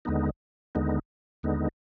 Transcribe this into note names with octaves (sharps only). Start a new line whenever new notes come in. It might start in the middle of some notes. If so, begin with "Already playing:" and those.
D#2 D3 G#3 B3 D#4
D#2 D3 G#3 B3 D#4
D#2 D3 G#3 B3 D#4